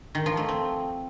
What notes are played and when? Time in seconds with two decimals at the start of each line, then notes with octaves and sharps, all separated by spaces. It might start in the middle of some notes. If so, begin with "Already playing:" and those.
0.15 D#3
0.26 F3
0.37 A3
0.48 C4